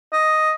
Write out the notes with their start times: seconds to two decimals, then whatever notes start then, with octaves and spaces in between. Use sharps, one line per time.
0.13 D#5